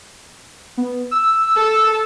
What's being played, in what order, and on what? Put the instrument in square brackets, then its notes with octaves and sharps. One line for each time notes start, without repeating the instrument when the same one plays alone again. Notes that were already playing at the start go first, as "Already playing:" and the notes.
[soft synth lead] B3
E6
[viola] A4